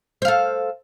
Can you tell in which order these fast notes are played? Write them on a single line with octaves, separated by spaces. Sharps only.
C5 F5 A4